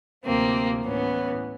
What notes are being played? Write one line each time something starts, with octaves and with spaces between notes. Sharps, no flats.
D2 C3 F3 A#3 C4
A2 E3 B3 C#4